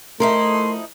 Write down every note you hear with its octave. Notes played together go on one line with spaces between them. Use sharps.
F3 A3 D#4 E4 A#4 C6